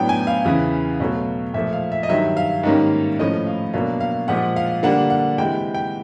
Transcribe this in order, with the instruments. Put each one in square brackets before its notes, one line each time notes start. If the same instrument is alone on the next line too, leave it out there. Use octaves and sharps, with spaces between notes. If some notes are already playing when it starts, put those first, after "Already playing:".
Already playing: [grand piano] A2 F#3 B3 D4 G5
G#5
F5
E2 C#3 E3
B2 F#3 A3
A#2 F3 A3 E5
F5
E5
D#5
G2 D#3 F#3 E5
F5
G#2 D#3 G3 A#3 C#4
A2 F3 A3 C#4 D#5
F5
B2 F#3 A#3 D4 F5
F5
A#2 F3 G#3 F#5
F5
D3 G3 A#3 D4 F#5
F#5
C3 E3 G#3 G5
G5